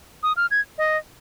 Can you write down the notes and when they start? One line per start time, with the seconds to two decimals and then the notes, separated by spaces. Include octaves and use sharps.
0.23 D#6
0.37 F6
0.51 G#6
0.78 D#5